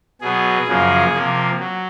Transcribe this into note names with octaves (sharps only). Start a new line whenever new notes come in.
B2 F#3 B3 G#4
F#2 C#3 F3 A#3
C3 F3 A#3
F#3